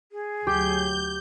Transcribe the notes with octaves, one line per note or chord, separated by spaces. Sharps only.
G#4
D2 F#3 G4 G6